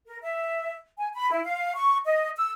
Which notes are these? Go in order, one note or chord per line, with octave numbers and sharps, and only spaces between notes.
A#4
E5
G#5
B5
E4
F5
C#6
D#5
E6